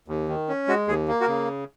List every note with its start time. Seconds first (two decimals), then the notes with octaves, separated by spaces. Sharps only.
0.08 D#2
0.28 D#3
0.49 C#4
0.68 G#3 F#4
0.87 D#2 G#4
1.08 A#3
1.21 F#4 A#4
1.27 C#3